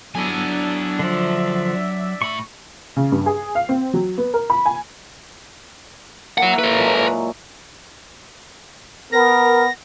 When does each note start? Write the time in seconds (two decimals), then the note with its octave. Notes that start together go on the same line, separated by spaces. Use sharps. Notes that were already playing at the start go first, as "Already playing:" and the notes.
0.15 F#3 B3 D4 E4 A4 G#5
0.99 D3 F3 D5 E5
2.22 A2 B5 C#6
2.96 C#3
3.12 G2
3.26 G#4
3.55 F5
3.69 C4
3.94 F#3
4.18 B3
4.34 A#4
4.50 B5
4.66 G#5
6.38 A#3 E4 C#5 F#5
6.59 A4 B4 C#5
6.77 A#2 F#3 G#3
9.12 B3 A#4 A#6